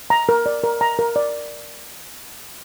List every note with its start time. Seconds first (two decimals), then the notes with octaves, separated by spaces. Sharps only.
0.10 A#5
0.29 A#4
0.46 D5
0.64 A#4
0.81 A#5
0.99 A#4
1.16 D5